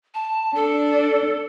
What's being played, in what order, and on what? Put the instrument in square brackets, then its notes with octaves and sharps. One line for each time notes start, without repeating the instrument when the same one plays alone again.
[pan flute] A5
[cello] D4 [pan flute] A4